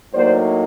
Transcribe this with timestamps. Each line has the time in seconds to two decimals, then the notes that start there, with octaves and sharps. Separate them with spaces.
0.13 A2 F#3 A#3 D#4 C5 D5